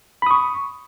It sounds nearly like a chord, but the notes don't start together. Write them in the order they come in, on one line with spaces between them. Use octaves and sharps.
B5 D#6 C#6